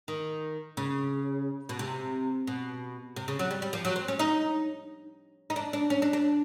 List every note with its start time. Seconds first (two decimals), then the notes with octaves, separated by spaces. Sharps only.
0.08 D#3
0.77 C#3
1.69 B2
1.79 C3
2.47 B2
3.16 C3
3.28 C#3
3.39 F#3
3.51 G3
3.62 G3
3.73 F3
3.85 F#3
3.96 C4
4.08 C#4
4.19 D#4
5.50 D#4
5.56 D4
5.73 D4
5.90 C#4
6.02 D4
6.13 D4